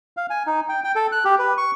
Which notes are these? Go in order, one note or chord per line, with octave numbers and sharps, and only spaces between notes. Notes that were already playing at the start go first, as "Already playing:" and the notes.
F5
G#5
D#4
G5
G5
A4
F#6
G4
B4
C#6